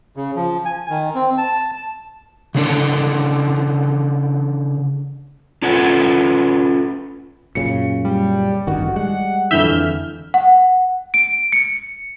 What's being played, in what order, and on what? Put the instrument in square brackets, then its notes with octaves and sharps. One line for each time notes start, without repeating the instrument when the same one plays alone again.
[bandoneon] C#3
F3
G#5
D#3
C4
A5
[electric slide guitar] C#3 E3 D4 A4
C#4 F4 A4 B4 C#5 F#5
[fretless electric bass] F#2 A#2 C#3 [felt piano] C#7
[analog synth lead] G3
[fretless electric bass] A1 G2 D#3 [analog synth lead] F#4
[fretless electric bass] G3 G#3 [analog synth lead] F#5
[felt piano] F2 D3 E3 [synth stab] E5 G6 [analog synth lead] F6
[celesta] F#5
D7
C#7